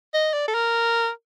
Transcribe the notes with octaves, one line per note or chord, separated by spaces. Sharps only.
D#5
D5
A4
A#4